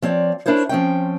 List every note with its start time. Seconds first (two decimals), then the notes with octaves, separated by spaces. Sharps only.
0.02 F3 C4 C#5 D5
0.46 D4 E4 A#4 C5 C#5
0.69 F3 C4 C#4 G5